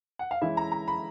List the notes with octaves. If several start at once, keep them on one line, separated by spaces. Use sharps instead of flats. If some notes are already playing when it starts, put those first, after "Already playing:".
F#5
F5
E3 G#3 C#4 E4 E5
A#5
A#5
B5